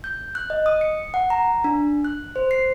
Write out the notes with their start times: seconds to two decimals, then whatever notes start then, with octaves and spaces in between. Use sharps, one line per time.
0.04 G6
0.35 F#6
0.50 D#5
0.66 D#6
0.81 C#7
1.14 F#5
1.30 A#5
1.64 D4
2.05 F#6
2.36 C5
2.51 C7